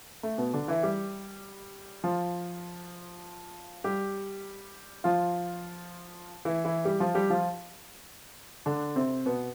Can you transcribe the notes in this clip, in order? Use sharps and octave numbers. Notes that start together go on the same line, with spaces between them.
A3
B2 B3
D3 D4
E3 E4
G3 G4
F3 F4
G3 G4
F3 F4
E3 E4
E3 E4
G3 G4
F3 F4
G3 G4
F3 F4
D3 D4
C3 C4
B2 B3